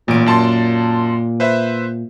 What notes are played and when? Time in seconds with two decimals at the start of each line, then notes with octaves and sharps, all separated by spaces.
0.08 A1 A#2 D7
0.26 F#2 A5 C6
1.40 B4 C5 E5